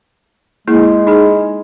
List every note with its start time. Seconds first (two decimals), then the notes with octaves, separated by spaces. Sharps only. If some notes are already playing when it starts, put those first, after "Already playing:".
0.68 G#3 A#3 E4 G#4
1.07 D#4 G#4